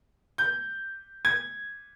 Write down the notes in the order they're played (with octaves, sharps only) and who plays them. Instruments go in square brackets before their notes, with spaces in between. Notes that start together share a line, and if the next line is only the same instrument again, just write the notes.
[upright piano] G6
G#6